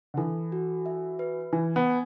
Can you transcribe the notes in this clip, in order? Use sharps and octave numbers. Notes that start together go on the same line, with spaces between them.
D3
E3 A4
F#4
E5
B4
E3 G#5
B3
G#5